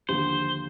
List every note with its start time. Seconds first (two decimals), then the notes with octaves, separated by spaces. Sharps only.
0.08 D#2 D3 F3 C5